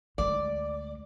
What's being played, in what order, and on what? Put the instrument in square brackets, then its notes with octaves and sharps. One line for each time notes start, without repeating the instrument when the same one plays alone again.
[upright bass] D2 G#3 [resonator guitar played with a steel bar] D5